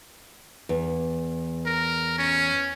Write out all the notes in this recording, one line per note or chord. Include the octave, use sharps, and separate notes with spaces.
E2
A#4
C#4